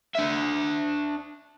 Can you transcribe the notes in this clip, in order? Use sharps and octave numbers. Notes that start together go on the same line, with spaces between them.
D4 E5